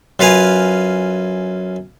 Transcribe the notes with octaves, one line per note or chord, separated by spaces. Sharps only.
F#2 F4 B4 F5 G#5